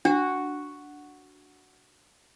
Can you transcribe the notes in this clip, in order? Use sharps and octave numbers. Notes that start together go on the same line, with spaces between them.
D4 F#4